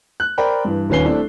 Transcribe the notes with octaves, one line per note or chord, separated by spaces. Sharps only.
F#6
A#4 C5 D5 G5 B5
G2 E3
D#1 D#2 C#4 B4 C7 G7
A3 C4 D4 E4 A4